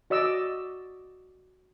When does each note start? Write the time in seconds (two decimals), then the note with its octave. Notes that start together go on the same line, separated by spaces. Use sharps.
0.10 F#4 D5 D#5 E6